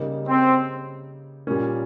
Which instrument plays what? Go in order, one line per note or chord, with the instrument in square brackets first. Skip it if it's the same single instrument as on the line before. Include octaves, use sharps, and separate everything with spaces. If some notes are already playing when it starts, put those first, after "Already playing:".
Already playing: [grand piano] C#3 G3 A#3 D#4
[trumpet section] C4
[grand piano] A#2 G3 A#3 C#4